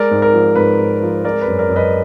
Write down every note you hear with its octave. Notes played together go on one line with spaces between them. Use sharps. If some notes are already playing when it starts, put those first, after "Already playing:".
Already playing: G#3 A#4 D5
G#2
A#4
F3
G#2 B4
G#2
F3
G#3 A#4 D5
B4
F#2
A#4 D5
F#2
B4 D#5